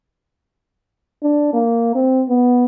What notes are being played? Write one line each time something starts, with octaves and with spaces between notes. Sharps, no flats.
D4
A#3
C4
B3